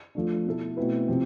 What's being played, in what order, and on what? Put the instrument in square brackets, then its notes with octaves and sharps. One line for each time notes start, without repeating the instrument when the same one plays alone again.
[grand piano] F3 A3 D4
B2 A3 E4 A4
B2 A3 C4 E4 B4
C3 F3 C4